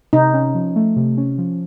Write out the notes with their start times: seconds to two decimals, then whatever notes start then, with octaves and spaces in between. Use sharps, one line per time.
0.13 C3 D#4
0.34 C#4
0.55 F3
0.76 A3
0.96 C3
1.17 C#4
1.38 F3